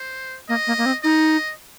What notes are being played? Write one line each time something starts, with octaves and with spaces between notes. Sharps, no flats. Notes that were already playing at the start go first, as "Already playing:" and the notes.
Already playing: C5
A#3 D#5
A#3
A#3
C4
D#4 D#5